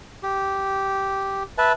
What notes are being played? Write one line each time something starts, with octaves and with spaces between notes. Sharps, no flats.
G4
B4 E5 A5